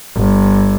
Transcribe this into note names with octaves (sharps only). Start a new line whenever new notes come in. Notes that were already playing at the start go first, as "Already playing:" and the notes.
G1